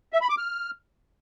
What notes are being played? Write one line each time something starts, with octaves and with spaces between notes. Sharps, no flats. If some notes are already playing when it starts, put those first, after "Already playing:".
E5
B5
D6
F6